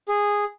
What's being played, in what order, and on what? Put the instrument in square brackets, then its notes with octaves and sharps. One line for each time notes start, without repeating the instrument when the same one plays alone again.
[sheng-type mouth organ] G#4